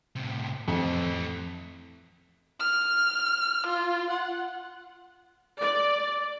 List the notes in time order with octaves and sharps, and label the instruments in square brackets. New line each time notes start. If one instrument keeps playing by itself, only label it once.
[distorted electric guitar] A2 C3
[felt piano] F2 [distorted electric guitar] E3 A3
[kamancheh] F6
F4
F#5
[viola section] D5